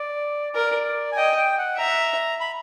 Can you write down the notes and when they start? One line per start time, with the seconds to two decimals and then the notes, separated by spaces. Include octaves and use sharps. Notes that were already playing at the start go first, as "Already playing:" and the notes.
Already playing: D5
0.55 A#4 D5
1.12 G#5
1.17 D#5 G5
1.37 G5
1.58 F#5
1.78 E5 A#5
2.40 B5